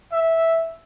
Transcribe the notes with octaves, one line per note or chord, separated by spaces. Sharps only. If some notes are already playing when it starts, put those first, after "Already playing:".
E5